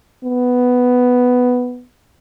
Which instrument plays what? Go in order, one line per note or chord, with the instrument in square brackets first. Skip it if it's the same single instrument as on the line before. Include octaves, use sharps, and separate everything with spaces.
[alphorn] B3